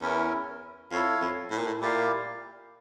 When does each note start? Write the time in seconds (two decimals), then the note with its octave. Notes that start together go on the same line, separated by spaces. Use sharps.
0.01 E2 C#4 E4 A#4
0.91 F2 E4 A4 C#5 F5
1.21 F2
1.51 A2
1.58 A#2
1.67 A2
1.81 A#2 E4 G4 D5 F5